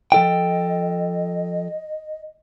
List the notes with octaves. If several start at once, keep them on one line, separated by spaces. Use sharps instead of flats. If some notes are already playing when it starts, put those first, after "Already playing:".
F3 A4 D#5 G5